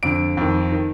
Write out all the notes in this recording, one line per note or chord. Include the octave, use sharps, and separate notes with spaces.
F2 D3 D7
F2 D#3
D#3